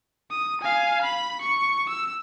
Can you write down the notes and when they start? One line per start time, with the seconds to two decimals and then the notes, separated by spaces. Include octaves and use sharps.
0.31 D#6
0.61 F5 G#5
1.02 B5
1.42 C#6
1.90 E6